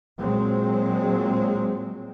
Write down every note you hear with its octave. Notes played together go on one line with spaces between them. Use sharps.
A#2 F#3 G#3 C4